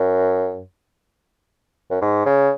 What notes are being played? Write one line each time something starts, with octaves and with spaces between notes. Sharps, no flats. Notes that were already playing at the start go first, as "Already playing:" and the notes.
Already playing: F#2
F#2
G#2
C#3